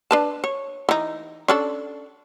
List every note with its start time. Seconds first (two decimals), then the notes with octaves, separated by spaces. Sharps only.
0.11 D4 B4 A5
0.44 C#5
0.89 E3 D#4
1.48 C#4 D4 A4